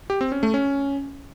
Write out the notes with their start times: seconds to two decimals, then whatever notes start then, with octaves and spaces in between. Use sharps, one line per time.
0.10 G4
0.21 C4
0.32 C#4
0.43 A3
0.54 C#4